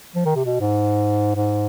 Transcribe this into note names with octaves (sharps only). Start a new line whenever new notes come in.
F3
D#3
C3
B2
G#2
G#2